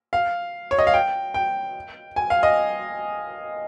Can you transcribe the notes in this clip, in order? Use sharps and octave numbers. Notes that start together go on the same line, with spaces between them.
F5
C#5
D#5
F5
G5
G5
G#5
F5
D#5